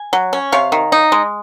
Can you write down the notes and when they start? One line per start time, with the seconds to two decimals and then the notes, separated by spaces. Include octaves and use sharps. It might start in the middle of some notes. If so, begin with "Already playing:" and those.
Already playing: G#5
0.13 F#3
0.33 C#4
0.52 C3 C#5 F5
0.72 D#3
0.92 D#4
1.12 G#3